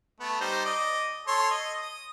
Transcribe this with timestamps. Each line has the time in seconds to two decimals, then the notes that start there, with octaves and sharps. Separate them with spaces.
0.20 A3 B3
0.40 G3 D#4 C5
0.65 D5 D#5
1.27 A4 C#5 C6
1.50 D#5
1.81 D#6